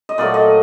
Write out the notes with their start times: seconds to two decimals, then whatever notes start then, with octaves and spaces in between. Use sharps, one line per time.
0.09 D#5
0.18 A#2 F#3 A3 D5
0.34 D#5